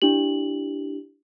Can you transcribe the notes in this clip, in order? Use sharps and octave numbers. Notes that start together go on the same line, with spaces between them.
D4 E4 G4 F#7